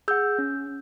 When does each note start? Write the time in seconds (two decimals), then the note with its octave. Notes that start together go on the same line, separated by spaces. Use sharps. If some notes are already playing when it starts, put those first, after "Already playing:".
0.08 G#4 F#5 E6 G6
0.39 C#4